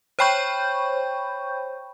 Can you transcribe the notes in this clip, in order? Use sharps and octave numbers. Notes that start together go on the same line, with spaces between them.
C5 C#5 G5 B5 C#6 G6